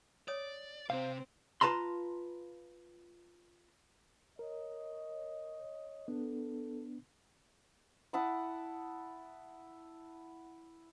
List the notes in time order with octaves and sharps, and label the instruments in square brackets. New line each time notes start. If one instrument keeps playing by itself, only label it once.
[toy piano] C#5 D#6 [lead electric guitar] D5
[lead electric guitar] C3 [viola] C4 [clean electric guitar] C5 F5
[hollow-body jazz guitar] F4 B4 A5 A#5 C6
[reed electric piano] A#4 [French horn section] C#5 D#5
[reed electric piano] B3 D4 [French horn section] A4
[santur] E4 F#5 A5 D#6